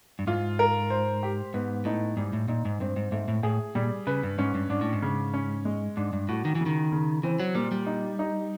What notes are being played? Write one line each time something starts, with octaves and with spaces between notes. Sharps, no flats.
G2
G#2 F4
A#4
C5
G4
G#2 B3
A2 D#4
G#2 G3
A2
A#2 D#4
G#2
G2 C4
G#2
G#2 A3
A2
A2 G#4
A#2 G3
C#3 B4
G2
G#2 C#4
G2
G#2 D4
A2
G#2
C#3
C#4
G#3
G#2 D4
G2
A2 F#4
D#3
E3
C#3
D#3
C#3
E3 C4
F#3
A#2 G3
G3
D#4
D#4